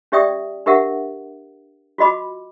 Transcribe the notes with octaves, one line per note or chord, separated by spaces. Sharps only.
C#4 G4 D5 E5 G5 D#6
D4 G4 A#4 E5 F#5
F4 F#4 D#5 B5 D6